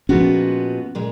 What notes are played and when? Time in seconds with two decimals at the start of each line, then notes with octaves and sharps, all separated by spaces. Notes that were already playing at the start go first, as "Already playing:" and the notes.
0.09 A#2 F3 G#3 B3 C#4 F#4
0.95 A#2 G#3